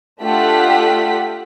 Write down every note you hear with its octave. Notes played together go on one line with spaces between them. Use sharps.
A3 D4 F4 G4 F#5 B6